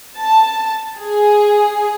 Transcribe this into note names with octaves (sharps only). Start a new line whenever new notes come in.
A5
G#4